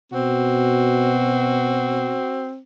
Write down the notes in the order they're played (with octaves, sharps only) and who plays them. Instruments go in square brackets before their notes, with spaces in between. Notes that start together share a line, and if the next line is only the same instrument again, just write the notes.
[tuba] B2 [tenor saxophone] C4 [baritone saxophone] F#4